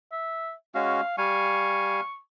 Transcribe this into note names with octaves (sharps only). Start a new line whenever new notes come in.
E5
G#3 C#4 F#4 F5
G3 F5 G#5 C#6